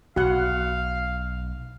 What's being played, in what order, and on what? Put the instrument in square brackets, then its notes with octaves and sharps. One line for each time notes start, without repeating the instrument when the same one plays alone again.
[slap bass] B1 [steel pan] F#4 F#5 [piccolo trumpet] F5